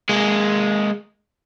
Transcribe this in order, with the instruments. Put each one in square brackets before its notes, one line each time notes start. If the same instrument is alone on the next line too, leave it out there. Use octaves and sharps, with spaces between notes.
[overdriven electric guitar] G#3 A#3